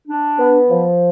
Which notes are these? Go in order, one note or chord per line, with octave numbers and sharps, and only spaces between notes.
D4
B3
F3